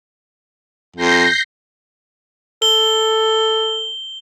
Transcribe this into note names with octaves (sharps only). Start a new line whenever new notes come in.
F2 G6 A#6 C7
A4 G7